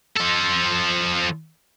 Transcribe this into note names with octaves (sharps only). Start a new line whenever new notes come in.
F3 A4